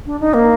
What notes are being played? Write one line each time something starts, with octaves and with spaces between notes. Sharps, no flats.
D4
D#4
A#3